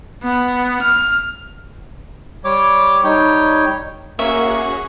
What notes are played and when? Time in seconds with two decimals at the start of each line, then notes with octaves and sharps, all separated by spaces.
0.23 B3
0.83 F6
2.45 G3 C#5 D6
3.04 G3 D#4 C#5 G5
4.19 A#3 C#4 F#4 G#4 E5 C#6